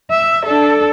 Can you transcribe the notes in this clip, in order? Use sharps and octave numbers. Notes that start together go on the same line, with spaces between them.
E5
D4 A4